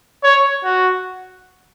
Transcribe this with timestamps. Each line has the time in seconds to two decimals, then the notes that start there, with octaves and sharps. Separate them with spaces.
0.24 C#5
0.64 F#4